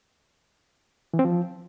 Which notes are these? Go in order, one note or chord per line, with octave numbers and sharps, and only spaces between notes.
E3
C4
F3